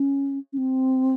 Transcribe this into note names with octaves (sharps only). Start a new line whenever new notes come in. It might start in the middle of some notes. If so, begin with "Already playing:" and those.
Already playing: C#4
C#4
C4